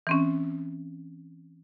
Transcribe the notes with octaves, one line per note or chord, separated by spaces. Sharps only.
E3 C4 C#4